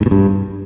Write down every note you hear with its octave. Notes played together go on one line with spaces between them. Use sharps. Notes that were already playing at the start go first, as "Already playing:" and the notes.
G#2
B2
G2